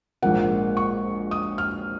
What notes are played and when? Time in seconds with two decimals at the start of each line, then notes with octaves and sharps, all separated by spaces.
0.22 A#1 G#2 F3 A#3 F#5
0.77 C#6
1.31 D#6
1.58 F6